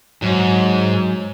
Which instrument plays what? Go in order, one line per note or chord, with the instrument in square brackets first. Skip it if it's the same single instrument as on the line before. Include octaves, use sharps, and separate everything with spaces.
[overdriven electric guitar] G#2 [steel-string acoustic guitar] F#3